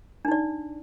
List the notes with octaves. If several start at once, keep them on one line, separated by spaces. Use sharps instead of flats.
D4 D#4 D5